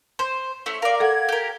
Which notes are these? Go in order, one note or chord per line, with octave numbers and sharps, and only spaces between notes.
C5 C6
A3 C#4 E4
A#4 D5 F5
A4 F5 F#5 G#6
G4 A#4